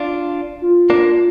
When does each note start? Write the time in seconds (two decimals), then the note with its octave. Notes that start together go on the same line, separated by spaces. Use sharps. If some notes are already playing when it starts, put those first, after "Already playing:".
Already playing: D4 F4
0.62 F4
0.90 A#3 D4